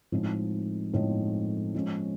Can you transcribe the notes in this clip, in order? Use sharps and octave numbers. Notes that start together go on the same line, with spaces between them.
A2 F3 G#3 C4 D#4
A2 F3 G#3 C4 D#4
F3 G#3 C#4